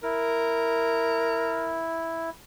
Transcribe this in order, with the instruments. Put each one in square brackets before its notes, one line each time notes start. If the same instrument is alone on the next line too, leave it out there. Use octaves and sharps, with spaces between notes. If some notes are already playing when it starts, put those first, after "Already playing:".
[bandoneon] E4 [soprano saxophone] A#4